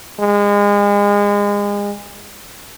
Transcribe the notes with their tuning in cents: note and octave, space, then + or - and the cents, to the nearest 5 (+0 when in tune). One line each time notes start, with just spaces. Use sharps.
G#3 -30